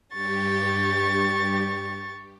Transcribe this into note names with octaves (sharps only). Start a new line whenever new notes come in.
G2 G4 C#6 A6